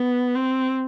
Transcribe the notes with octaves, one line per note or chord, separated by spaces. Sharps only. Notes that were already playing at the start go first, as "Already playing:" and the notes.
Already playing: B3
C4